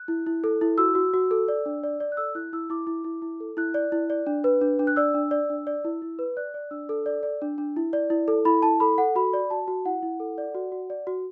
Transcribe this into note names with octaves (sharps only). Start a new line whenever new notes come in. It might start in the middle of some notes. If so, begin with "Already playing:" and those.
Already playing: F#6
E4
E4
A4
E4
F#4 E6
F#4
F#4
A4
D5
D4
D5
D5
F#6
A4 E6
E4 F#6
E4 E6
E4 D6
E4
E4
E4
A4
E4 F#6
D5
E4
D5
D4
B4
D4
D4
F#6
D5 E6
D4
D5
D4
D5
E4
E4
B4
D5 F#6
D5
D4 E6
A4
D5
D5
D4
D4
E4
D5
E4
A4
E4 B5
E4 A5
A4 B5
A4 F#5
F#4 B5
D5
F#4 A5
F#4
E4 F#5
E4
A4
D5
F#4
F#4
D5
F#4